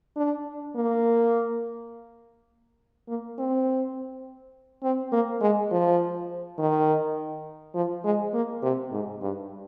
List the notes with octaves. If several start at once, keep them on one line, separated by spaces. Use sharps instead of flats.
D4
A#3
A#3
C4
C4
A#3
G#3
F3
D#3
F3
G#3
A#3
C3
G#2
G2